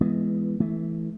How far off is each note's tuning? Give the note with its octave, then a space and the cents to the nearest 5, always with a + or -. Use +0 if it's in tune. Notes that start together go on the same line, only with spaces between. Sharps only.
E3 +20 G#3 +0 B3 +0
E3 +0 A3 -30